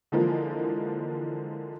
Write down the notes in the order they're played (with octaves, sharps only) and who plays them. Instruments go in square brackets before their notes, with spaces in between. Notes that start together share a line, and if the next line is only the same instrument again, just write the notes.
[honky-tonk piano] D3 E3 F3 G#3 A#3